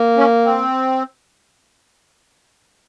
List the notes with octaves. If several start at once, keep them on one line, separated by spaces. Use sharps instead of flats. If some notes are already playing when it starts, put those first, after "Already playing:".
Already playing: A#3
C#4
C4